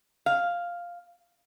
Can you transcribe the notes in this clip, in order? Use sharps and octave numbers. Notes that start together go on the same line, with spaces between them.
F5